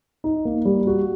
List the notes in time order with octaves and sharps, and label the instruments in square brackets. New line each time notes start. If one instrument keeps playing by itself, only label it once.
[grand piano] D#4
A#3
G3
F#4